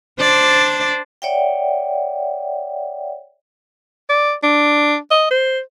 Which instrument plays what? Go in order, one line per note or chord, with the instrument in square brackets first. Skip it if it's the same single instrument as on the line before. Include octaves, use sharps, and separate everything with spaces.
[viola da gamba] D4 C5 D5
[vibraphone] C#5 D5 E5 F#5 G5
[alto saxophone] D5
D4
D#5
C5